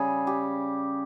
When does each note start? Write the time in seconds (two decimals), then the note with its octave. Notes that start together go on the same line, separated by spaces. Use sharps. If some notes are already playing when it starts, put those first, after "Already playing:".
Already playing: C#3 G3 G#4
0.27 G4